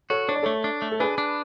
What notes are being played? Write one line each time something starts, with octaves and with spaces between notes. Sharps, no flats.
F#4 A4 C#5
D4 C#5
D5
A3 A4 C#5
D4
A3
A4
D4 G#4 B4
D4